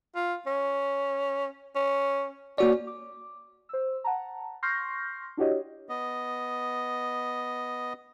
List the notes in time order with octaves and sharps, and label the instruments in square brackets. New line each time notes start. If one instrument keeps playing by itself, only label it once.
[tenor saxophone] F4
C#4
C#4
[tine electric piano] A#3 F#4 D5 [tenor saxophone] C#4
[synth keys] D6
C5 E6
F#5 A5 A#5
C6 C#6 F6 G6 A#6 C7
D4 E4 F#4 G4 C#5 D#5
[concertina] B3 D#5